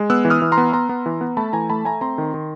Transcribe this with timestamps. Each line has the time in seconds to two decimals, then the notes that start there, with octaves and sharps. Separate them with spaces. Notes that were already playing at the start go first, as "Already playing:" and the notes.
Already playing: G#3
0.10 B3 E6 F#6
0.25 E3
0.30 D#6 F6
0.42 E3
0.52 A#5 C6
0.57 B3
0.73 B3 A#5 C6
0.89 B3
1.06 E3
1.21 B3
1.37 A3 A5 B5
1.53 E3 G#5 A#5
1.70 A3 A5 B5
1.85 A3 G#5 A#5
2.01 C4 A#5 C6
2.18 D#3
2.34 D#3